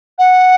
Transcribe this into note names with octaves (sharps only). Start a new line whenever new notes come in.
F#5